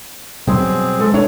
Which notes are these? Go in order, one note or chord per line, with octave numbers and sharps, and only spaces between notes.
B2 F#3 G3 C4 G#4
G#3 A4
D4 C#5